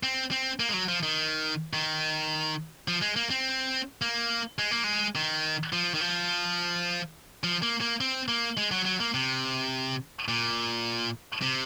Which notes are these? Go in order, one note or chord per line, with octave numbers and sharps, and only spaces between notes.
C4
C4
A#3
G#3
F#3
F3
D#3
D#3
F3
G#3
A#3
C4
A#3
G#3
A#3
G#3
D#3
F3
D#3
F3
F3
A#3
A#3
C4
A#3
G#3
F#3
F#3
A#3
C3
A#2
C3